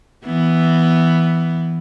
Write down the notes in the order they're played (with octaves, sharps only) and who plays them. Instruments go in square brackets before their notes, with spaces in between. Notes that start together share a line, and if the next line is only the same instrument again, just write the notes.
[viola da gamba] E3 B3